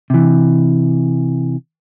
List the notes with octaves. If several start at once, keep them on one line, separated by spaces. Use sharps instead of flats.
C3 E3